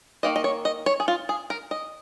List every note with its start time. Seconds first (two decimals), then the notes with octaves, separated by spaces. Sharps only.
0.23 D#3 A#3 D#5
0.36 D#5
0.44 C#5
0.65 D#5
0.86 C#5
1.00 G#4
1.08 F4
1.29 G#4
1.50 A#4
1.71 D#5